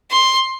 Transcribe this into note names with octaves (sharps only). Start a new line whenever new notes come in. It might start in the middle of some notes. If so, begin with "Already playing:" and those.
C6